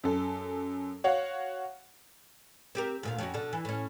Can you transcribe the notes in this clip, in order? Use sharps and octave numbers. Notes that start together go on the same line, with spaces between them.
F#2 A4
F#4 C#5 F5 F#5
C4 G4 A#4
D2 A#2 F5
F2 C#4 F#4
B2 D3
E3
A2 C#4